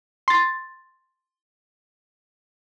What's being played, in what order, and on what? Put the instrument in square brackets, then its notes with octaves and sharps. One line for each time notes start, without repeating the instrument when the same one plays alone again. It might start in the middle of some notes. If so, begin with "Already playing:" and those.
[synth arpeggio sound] C6 A6